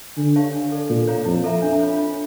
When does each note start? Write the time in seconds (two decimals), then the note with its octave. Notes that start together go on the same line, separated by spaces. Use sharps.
0.17 D3 D4
0.36 G4 C#5 F5 A5
0.53 D4
0.72 A4 D5
0.89 A#2 A4
1.08 C#5 F5 A#5
1.25 F2 E4
1.44 A4 E5 A#5
1.62 D4
1.80 F4 C#5
1.98 F4